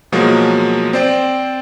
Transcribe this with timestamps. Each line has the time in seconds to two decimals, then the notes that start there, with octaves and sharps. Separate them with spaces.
0.12 B2 F3 F#3 G#3 A#3
0.93 C4 C5 D5 G5